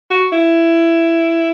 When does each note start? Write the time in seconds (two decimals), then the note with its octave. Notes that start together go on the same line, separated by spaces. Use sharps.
0.11 F#4
0.32 E4